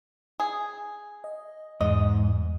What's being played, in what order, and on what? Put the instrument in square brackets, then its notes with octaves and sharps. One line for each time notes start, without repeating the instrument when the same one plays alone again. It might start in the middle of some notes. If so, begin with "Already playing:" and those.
[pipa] G#4
[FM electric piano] D#5
[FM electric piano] E2 [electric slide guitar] G#2 [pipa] D#5